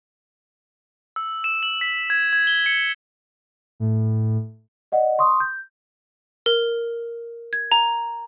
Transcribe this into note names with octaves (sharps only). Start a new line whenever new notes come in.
E6
E7
F#7
B6
G#6
G#6
G7
C#7
A2
D5 D#5 F#5
C6 C#6 D#6
G6
A#4
G#6
A#5